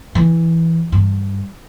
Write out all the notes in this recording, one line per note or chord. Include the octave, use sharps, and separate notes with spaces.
E3
G2